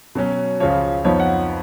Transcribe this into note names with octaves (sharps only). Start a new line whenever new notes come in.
B2 F#3 C#4
C#2 C#3 F3 C#5
F2 F3 B3 D#4 C#5
F#5